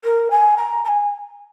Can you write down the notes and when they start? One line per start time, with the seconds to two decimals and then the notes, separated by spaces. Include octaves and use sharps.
0.04 A#4
0.30 G#5
0.57 A#5
0.84 A#5
0.88 G#5